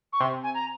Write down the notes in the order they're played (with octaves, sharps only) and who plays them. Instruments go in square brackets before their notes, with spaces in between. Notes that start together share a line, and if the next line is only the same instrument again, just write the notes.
[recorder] C#6
[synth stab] C3 [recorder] C6
[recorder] G#5
A#5